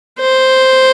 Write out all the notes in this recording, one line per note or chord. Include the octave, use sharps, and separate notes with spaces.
C5